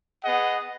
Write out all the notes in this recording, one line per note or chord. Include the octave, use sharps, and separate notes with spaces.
B3 G#4 D#5 F#5